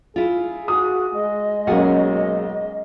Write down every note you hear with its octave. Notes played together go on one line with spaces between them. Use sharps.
E4 F4 G#4
F#4 D#6
G#3 D#5
B1 A#3 C#4 G#4 F#5 G#5